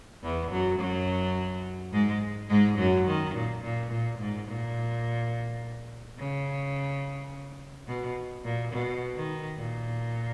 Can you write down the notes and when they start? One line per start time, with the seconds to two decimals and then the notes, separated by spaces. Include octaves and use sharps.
0.23 E2 E3
0.51 F#2 F#3
0.79 F#2 F#3
1.92 G#2 G#3
2.49 G#2 G#3
2.78 F#2 F#3
3.07 D#3
3.35 A#2
3.63 A#2
3.91 A#2
4.19 G#2
4.48 A#2
6.18 C#3
7.88 B2
8.44 A#2
8.73 B2
9.16 D#3
9.58 A#2